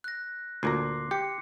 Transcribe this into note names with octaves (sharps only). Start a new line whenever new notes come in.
F#6 A#6
D2 A#2 A#5 C6 D6 C7
G4 C#7